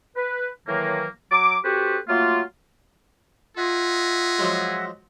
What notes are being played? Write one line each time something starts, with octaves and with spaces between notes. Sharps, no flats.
B4
A2 D#3 E3 F#3 A#3
F#3 D6
C4 F#4 G4 A4 B4 C5
F#3 A3 A#3 F4
F4 G#4 D#5 E5 F#5
F3 F#3 G#3